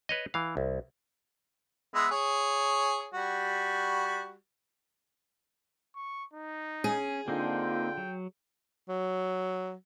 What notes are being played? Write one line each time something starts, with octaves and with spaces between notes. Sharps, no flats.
B4 C#5 D#5
E3 F5
C2
G#3 B3 E5
G#4 C#5
G3 F#4
C#6
D#4
C#4 G#4
D3 A#3 C4 D#4 F4 G5
F#3
F#3